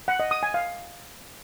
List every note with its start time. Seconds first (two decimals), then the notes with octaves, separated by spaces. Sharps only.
0.08 F#5
0.20 D#5
0.31 D#6
0.43 G#5
0.54 F5